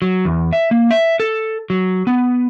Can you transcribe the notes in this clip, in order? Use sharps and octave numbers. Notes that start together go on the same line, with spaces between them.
F#3
E2
E5
A#3
E5
A4
F#3
B3